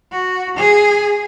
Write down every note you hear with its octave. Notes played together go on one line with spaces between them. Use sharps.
F#4
G#4